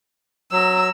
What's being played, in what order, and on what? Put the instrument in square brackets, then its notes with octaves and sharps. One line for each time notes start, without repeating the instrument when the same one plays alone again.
[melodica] F#3 [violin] A#5 E6